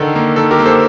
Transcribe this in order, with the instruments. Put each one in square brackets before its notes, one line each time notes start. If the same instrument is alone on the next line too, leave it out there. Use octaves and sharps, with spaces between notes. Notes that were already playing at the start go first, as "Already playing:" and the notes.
Already playing: [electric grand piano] D3 D#3 A4
A#3
D#3 A4
G4 A#4
A#3
A4 C5